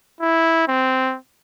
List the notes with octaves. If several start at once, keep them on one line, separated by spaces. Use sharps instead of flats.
E4
C4